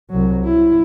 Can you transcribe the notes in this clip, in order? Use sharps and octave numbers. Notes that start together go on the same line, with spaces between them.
C2 F#3
E4